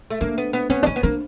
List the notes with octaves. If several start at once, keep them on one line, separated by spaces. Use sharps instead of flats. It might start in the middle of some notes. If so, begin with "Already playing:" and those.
A3
A#3 D4
B3
B3
B3 C#4
D4
C#4 D#4
B3
A#3 D4